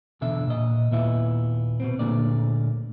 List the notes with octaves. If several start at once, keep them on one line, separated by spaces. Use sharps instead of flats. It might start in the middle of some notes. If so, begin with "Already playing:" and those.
E2 B2 D3 E5
A#2 D#5
D#2 A#2 B3 E4 E5
B2 B3 C4
D2 G2 A#2 D3 A#3 D5